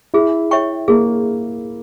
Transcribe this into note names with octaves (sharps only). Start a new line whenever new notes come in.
E4 G#4
C#5 E5 G5 C#6
A#3 G#4